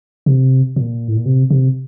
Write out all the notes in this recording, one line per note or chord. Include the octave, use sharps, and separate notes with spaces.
C3
A#2
A2
A#2
C3
C3